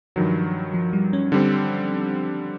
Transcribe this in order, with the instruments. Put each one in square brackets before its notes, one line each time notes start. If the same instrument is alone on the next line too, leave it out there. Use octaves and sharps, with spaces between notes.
[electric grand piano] G2 D#3 F#3 [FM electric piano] F3
[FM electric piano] F3
G3
C#4
[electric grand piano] D3 G3 C4